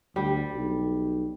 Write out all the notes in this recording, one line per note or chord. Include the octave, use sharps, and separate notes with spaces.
D2 G3
B1